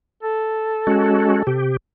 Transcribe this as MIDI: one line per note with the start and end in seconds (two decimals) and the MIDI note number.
0.23 1.63 69
0.87 1.43 56
0.87 1.43 61
0.87 1.43 66
1.47 1.77 48
1.47 1.77 67